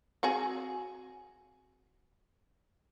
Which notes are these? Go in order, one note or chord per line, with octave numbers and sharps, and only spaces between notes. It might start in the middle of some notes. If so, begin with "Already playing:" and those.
C4 F#4 G#4